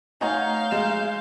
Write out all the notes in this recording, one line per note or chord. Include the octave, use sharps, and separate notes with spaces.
A3 D#4 C#5 F5 F#5 G#5 A#5 G6
G#3 E7